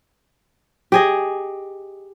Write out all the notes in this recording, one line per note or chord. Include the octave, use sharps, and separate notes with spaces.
G4 G#4 D#5